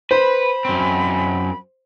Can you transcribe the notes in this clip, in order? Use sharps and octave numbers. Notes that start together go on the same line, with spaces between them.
B4 C5 B5
F#2 C4